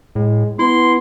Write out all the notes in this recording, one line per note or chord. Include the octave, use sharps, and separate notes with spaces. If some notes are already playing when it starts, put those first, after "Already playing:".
A2 G#3
B3 E4 C6